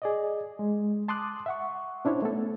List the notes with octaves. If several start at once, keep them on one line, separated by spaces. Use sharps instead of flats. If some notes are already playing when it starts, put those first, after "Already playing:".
G#4 D5 D#5
G#3
A5 C6 D6 D#6 F#6
E5 F#5 C#6
C#4 D4 E4 C5 C#5
A3 B3 A4